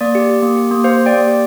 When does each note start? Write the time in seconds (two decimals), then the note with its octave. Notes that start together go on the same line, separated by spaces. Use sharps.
0.01 A#3 D5
0.15 G4
0.30 G4
0.43 A#3
0.56 G4
0.71 A#3
0.84 G4 C5 F5
0.99 G4
1.06 D5 G5
1.13 A#3
1.27 G4